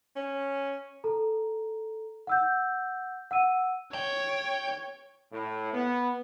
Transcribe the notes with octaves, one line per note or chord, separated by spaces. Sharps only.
C#4
A4 A#5
F#5 E6 G6
F#5 E6 D#7
C#5 G5
A2
B3